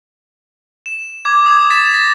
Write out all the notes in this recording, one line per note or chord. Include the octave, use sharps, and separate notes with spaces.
E7
D6 G#6
D#6 G#6
A6 B6 E7
A6 A#6